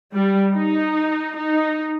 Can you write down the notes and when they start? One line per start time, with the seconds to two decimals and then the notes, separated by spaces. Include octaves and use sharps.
0.13 G3
0.54 D#4
1.36 D#4